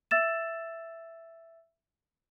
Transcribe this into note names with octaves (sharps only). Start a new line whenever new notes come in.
E5 E6 A6 E7